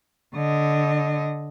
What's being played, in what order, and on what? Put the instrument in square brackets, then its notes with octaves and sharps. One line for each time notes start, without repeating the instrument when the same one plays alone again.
[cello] D3 D#5